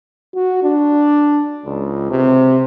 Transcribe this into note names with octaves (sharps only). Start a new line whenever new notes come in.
F#4
D4
C#2
C3